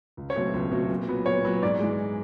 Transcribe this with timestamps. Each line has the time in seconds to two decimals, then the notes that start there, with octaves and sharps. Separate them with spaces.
0.17 C#2
0.30 C#5
0.36 B2 F#3 A3 C4
0.53 C#2
0.71 B2 F#3 A3 C4
0.90 A#2
1.09 F#3 B3
1.25 A#2 C#5
1.44 F#3 B3
1.62 G#2 D5
1.80 E3 G#3